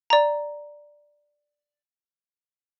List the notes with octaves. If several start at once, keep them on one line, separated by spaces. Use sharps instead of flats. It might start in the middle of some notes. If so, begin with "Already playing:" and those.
D5 A#5